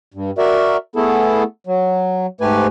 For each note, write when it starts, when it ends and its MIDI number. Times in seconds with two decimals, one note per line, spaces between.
0.14 0.31 43
0.38 0.77 66
0.38 0.77 70
0.38 0.77 74
0.38 0.77 76
0.96 1.43 57
0.96 1.43 59
0.96 1.43 64
0.96 1.43 68
0.96 1.43 69
1.67 2.26 54
2.41 2.67 44
2.41 2.67 57
2.41 2.67 67
2.41 2.67 71
2.41 2.67 80